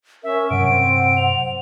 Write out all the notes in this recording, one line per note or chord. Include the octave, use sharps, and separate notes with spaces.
C#4 A#4 E5
G2 C3 F#3 F#5 D7
C4
C5 F7